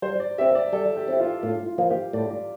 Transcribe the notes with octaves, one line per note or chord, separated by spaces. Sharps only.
G3 C5
D5
C4 E4 G4 E5
D5
G3 A4
G4
C4 E4 G4
F4
A2 F4
F4
F3 A#3 F4
G4
A2 D5
D5